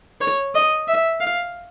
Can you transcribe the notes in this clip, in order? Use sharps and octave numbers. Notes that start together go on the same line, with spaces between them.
C#5
D#5
E5
F5